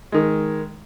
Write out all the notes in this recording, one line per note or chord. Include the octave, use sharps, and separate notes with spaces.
D#3 G#3